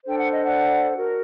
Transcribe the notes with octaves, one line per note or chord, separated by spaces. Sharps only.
D4 A4 C5 G5
F#5
D#5
D5 F#5
F#4 A#4